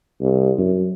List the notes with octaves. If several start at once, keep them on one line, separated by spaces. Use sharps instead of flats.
C2
F#2